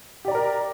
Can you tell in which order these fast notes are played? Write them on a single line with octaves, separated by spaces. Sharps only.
G4 D5 A#5 A#4